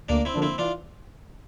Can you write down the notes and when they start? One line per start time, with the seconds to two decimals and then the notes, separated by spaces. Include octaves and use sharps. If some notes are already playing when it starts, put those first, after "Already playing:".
0.09 D2 A#3 D4
0.25 C4 E4
0.34 D3 F3 A#3 D4
0.42 C4 E4
0.58 E3 D4 F4